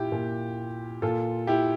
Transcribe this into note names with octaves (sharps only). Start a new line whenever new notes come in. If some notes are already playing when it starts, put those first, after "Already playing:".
Already playing: A#2 E4 F4 G4
A#2
A#2 F4 A4
E4 G4